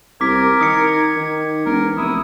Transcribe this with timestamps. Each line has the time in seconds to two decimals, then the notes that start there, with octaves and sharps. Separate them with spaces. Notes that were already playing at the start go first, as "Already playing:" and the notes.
0.21 C2 A#4 D6 G#6 B6
0.61 D#3 D#6 C#7
1.16 D#3
1.66 E1 A#4
1.97 F1 E4 D#6